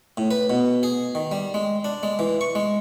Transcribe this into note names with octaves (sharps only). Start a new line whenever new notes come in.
A2
B4
B2
G#4
D#3
G3
G#3
D4
G#3
E3
C#6
G#3